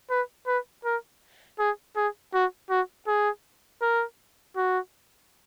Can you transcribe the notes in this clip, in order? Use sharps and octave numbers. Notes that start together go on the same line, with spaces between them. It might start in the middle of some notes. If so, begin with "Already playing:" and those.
B4
B4
A#4
G#4
G#4
F#4
F#4
G#4
A#4
F#4